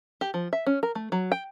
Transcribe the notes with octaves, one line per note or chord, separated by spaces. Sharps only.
G4
F3
E5
C#4
A#4
A3
F#3
G5